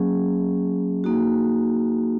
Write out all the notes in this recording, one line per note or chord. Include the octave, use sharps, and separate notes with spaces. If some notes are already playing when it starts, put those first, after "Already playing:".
Already playing: F#3 A#3 C#4 G#4
A#3 D#4 F#4